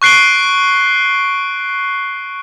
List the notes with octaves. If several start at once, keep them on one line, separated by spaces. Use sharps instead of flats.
C#6 F#6 C7 D7 G7